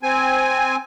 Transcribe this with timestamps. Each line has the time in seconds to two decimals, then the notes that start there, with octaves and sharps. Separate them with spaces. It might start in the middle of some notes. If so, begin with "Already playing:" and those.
0.03 C4 G#5